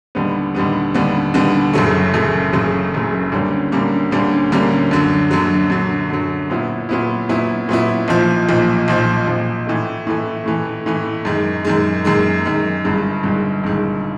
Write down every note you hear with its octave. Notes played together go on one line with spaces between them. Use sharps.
D#2 D3 G3 B3
D#2 D3 G3 B3
D#2 D3 G3 B3
D#2 D3 G3 B3
F#1 F#2 C#3 F#3 A3
F#1 F#2 C#3 F#3 A3
F#1 F#2 C#3 F#3 A3
F#1 F#2 C#3 F#3 A3
D2 D3 G3 A#3 C#4
D2 D3 G3 A#3 C#4
D2 D3 G3 A#3 C#4
D2 D3 G3 A#3 C#4
F#2 D3 F#3
F#2 D3 F#3
F#2 D3 F#3
F#2 D3 F#3
A#2 F#3 B3 E4
A#2 F#3 B3 E4
A#2 F#3 B3 E4
A#2 F#3 B3 E4
B1 A#2 F3
B1 A#2 F3
B1 A#2 F3
B1 A#2 F3
A2 E3 A3
A2 E3 A3
A2 E3 A3
A2 E3 A3
F#2 D#3 G#3
F#2 D#3 G#3
F#2 D#3 G#3
F#2 D#3 G#3
G1 G2 D#3 G#3
G1 G2 D#3 G#3
G1 G2 D#3 G#3